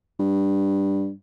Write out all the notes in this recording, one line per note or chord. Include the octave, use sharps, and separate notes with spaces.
G2